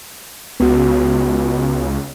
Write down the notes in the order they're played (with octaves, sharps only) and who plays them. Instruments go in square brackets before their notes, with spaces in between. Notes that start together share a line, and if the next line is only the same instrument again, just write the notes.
[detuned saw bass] C#2 [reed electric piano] B3 F#4